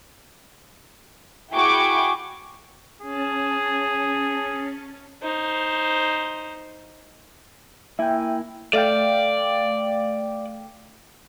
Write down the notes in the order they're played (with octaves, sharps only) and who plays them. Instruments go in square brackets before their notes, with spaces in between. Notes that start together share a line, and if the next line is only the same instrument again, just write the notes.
[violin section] E4 F#4 G#4 G5 C#6 D6
[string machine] C#4 A5 [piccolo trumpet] G#4
[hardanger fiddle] D#4 C5
[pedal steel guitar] A#3 E4 G#5 [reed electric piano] E5 G5
[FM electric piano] A3 F5 G5 [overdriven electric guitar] D5